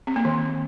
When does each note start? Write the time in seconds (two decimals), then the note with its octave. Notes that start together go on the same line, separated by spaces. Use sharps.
0.07 C4
0.16 A#3
0.25 D#3